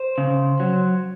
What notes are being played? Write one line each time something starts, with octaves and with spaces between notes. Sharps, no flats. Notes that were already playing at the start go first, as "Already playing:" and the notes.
Already playing: C5
C#3
F#3